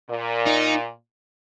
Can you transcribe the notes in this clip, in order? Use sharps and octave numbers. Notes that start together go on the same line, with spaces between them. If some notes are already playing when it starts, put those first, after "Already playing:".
A#2
D#4